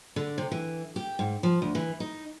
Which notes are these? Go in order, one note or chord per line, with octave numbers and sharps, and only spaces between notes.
D3
C3
E3
G4
G#2
F3
D2
E3
D#4